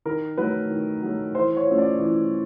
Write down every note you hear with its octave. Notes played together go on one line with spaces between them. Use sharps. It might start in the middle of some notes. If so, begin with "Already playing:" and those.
D#3 A#4
F#3 A3 B4
D#3
F#3 A3
E3 C5
C#5
A3 C#4 F4
D5
E3